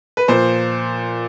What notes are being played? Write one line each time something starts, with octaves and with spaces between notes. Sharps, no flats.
B4
A#2 F3 C5